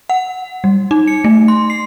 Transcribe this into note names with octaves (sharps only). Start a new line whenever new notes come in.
F#5
G3
D#4
C#7
A3
C6
C7